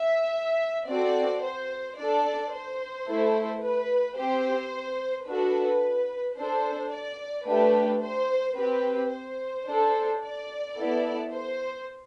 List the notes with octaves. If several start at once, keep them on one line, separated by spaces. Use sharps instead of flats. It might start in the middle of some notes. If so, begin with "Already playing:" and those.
Already playing: E5
C4 F#4 A4 D5
C5
D4 A4 D5
C5
A3 E4 A4
B4
C4 G4 C5
D4 F#4 A4 B4
D4 A4 C5
D5
A3 D4 G4 B4
C5
C4 G4 B4
C5
D4 A4
D5
B3 E4 A4
C5